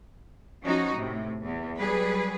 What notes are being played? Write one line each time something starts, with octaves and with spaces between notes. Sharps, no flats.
F3 C#4 D#4 F#4
A2 C3
E2
F#3 G3 G#4 B4